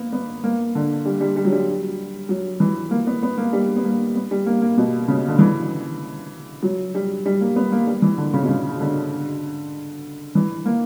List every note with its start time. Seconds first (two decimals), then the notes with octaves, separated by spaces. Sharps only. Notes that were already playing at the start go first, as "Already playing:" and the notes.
Already playing: A#3 B3
0.12 B3
0.44 A#3
0.75 D3
1.05 G3
1.21 G3
1.36 G3
1.45 F#3
1.52 G3
2.29 F#3
2.60 E3
2.91 A#3
3.07 B3
3.23 B3
3.38 A#3
3.53 G3
3.76 B3
3.85 A#3
4.15 B3
4.31 G3
4.46 A#3
4.62 A#3
4.77 B2
5.08 C#3
5.28 D3
5.39 E3
6.63 F#3
6.95 G3
7.26 G3
7.41 A#3
7.56 B3
7.72 A#3
7.87 G3
8.02 E3
8.18 D3
8.34 C#3
8.43 B2
8.49 C#3
8.80 D3
10.35 E3
10.65 A#3